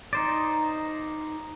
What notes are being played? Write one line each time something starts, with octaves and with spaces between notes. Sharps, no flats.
D#4 C5 D5